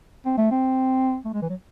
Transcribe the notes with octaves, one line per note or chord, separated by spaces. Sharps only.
C4
A3
C4
A3
G#3
E3
F#3